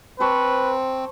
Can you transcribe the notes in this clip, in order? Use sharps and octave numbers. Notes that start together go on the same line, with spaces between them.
C4 B4 C5 A5 C#6